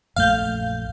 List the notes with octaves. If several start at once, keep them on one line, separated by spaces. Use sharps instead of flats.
A#1 F#2 A3 F5 G6